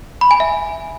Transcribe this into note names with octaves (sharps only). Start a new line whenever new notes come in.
B5
G#5
E5